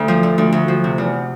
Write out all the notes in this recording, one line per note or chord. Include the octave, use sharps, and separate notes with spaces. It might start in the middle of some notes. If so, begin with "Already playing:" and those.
Already playing: D2
F3
D3
D2
D2
F3
C3
E2